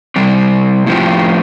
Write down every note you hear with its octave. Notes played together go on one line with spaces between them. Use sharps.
C3 G3 C4
A2 F3 C4 G4